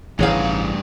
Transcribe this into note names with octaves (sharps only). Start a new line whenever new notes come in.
A1 G2 C#3 E3 D#4 G#4 C#5 F5